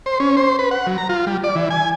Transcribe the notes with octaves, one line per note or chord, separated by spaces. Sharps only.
C5
C#4
C5
B4
F#5
F#3
A#5
F4
G3
D5
E3
G#5